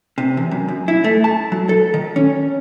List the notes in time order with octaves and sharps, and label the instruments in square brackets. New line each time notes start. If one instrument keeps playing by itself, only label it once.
[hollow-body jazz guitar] C3
E2
F#2
F#2
E4
A3
A5
F#3
A4
D#3
C#4